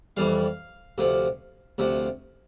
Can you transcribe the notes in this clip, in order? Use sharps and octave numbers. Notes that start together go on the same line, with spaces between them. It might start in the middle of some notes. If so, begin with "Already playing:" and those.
F2 E3 G3 F5
D2 C3 F3
D2 C3 F3